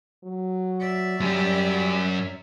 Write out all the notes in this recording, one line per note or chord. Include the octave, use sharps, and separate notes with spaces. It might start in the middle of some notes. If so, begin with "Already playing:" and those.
F#3
D5 E5
F#2 G3 C#4